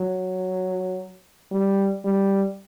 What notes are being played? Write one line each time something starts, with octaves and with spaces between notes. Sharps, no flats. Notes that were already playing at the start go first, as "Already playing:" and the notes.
Already playing: F#3
G3
G3